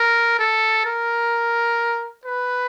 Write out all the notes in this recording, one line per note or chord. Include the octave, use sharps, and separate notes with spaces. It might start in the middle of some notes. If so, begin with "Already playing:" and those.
Already playing: A#4
A4
A#4
B4